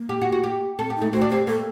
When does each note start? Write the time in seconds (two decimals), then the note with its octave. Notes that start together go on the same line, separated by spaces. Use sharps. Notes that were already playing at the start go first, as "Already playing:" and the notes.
Already playing: A#3
0.09 G4
0.21 F#4
0.32 F#4
0.44 G4
0.79 C4 A4
0.90 G4
0.96 D#4
1.02 A3
1.12 C4 F#4
1.21 D4
1.30 C4 G4
1.47 A#3 A4